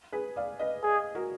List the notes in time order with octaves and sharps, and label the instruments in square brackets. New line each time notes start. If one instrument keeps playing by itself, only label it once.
[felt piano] G#4 B4
D5 F5
B4 D#5
[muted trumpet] G#4
[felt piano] F#4 A#4